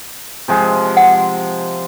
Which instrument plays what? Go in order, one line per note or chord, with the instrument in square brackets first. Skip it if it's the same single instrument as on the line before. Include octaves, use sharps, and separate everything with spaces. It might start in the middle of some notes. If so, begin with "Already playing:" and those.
[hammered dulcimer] C3 F3 G#3
[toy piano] F#5